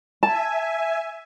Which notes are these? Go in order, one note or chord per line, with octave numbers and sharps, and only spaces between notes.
E5 G#5 A5